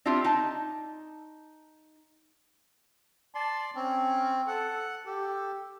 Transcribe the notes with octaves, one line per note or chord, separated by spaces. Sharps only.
C4 D4 E4 F4 G4
D#4 A5
D5 A5 C6
C4 C#4
A4 F#5
G4 A4